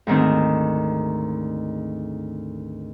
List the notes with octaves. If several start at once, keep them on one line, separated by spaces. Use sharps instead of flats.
D2 G#2 D#3 C4